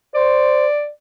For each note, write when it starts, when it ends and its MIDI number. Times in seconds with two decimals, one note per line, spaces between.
0.15 0.66 72
0.15 0.89 74